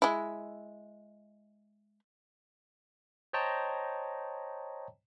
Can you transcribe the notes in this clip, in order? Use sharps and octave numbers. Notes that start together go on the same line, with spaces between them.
G#3 E4
C5 C#5 D#5 G5 A5 A#5